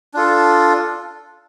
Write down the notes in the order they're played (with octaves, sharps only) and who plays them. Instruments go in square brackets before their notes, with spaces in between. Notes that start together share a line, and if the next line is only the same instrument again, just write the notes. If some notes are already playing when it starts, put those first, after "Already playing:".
[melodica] D4 F4 A4